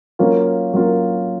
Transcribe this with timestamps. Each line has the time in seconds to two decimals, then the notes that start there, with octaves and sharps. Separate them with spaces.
0.19 F#3 A#3 C#4 F4
0.73 F#3 A#3 C#4 F4